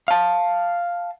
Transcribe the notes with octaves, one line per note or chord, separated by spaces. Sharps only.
F5 A5